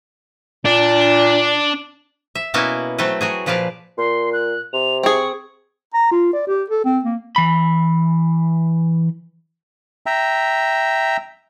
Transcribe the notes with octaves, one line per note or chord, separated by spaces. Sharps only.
A#2 D4
E5
B2 A#3 B3 C#4 E4 F#4
F#3 A3 C4 A4 B4
F#3 F#4 G#4
A#2 F3 B4 D5 F5
A#2 C6
F#6
C3 F7
C4 G#4 C#6
A#5
F4
D5
G4
A4
C4
A#3
E3 B5
E5 G5 A#5